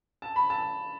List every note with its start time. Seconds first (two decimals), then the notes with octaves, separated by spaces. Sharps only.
0.22 A5
0.36 B5
0.50 A5